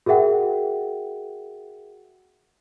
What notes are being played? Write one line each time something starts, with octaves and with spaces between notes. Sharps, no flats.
F#4 G#4 A#4 E5 F#5 G5